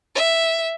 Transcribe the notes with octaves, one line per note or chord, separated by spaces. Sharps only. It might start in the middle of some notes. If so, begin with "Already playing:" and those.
E5